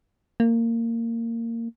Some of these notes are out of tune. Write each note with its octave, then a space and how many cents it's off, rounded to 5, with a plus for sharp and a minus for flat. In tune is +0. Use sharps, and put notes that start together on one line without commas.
A#3 -20